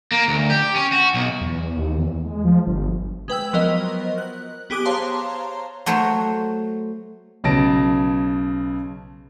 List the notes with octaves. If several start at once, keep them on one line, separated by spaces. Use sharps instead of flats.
A#3
D2
G4
C#4
F#4
B1
E2
D#2
E2
G#3
F3
G1
G#3 B4 G5 E6
F3 F#3 B3 A#4 C5 D#5
F#6
B3 G4 G#4 D6 D#6 F#6
C5 C#5 F5 A5 A#5 C6
F#3 A3 C5 C#5
B1 C#3 B3 A5 A#6 D7